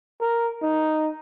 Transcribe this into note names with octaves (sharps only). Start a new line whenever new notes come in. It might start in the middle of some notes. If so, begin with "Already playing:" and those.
A#4
D#4